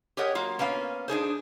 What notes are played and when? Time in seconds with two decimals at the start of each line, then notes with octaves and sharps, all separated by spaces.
0.17 G4 G#4 A#4 C#5 D#5 F#5
0.35 F#3 A#3 F4
0.59 A#3 B3 C#4 F5
1.08 D4 D#4 G#4 C5